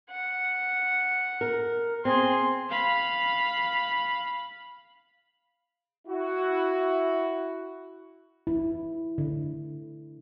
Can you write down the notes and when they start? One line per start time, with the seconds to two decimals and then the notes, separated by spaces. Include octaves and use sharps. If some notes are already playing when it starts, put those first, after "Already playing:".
0.11 F#5
1.41 A#4
2.05 C4 G#4 C6
2.70 F5 B5
6.08 E4 F#4
8.47 E4
9.18 D3